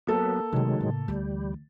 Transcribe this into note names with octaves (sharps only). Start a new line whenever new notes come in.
F#3 A#3 B3 A4
C3 D#3 F#3 G#3 A3
A2 C#3
D2 E3 G3